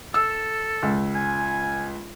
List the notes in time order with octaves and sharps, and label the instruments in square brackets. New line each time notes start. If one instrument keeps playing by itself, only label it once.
[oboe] A4 [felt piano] E6
[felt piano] C#2
[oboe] G#5